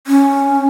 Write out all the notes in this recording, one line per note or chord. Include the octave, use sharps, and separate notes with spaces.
C#4